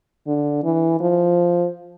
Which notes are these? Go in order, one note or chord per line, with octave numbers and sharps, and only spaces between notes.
D3
E3
F3